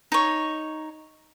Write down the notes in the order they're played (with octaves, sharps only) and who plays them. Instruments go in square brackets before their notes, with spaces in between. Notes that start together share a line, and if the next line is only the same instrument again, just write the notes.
[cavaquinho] D#4 C#5